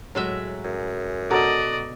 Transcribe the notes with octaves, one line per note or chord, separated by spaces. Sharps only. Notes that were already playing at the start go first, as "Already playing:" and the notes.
A2 F#3 G#3 E5
F#2
B2 F#4 A4 D5 D#5 A#5